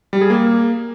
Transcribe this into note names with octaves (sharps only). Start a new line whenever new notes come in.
G3
G#4
A#3